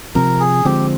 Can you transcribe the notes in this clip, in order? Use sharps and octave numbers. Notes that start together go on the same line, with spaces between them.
C3 F3 C4 A#4
G#4
D3 F3 G#3 C4 G4